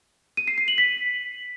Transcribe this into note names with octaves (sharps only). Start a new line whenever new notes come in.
D#7
C7
C7
F#7
B6